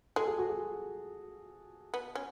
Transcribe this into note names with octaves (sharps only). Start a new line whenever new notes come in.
G#3 A4
G#4
F#4
G#4
B3
C#4